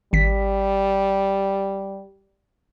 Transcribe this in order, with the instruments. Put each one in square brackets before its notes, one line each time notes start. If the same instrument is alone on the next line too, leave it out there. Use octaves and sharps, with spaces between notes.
[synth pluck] G#1 B6 [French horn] G3